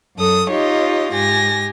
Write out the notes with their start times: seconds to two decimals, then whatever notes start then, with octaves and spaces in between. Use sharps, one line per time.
0.16 F#2 F#3 A4 D#6
0.49 D#4 F4 G4 C#5 D#5
1.14 G#2 G4 G#5 A#6